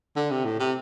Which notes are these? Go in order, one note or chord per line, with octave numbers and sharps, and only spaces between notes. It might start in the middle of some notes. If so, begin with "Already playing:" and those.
D3
C3
A2
C3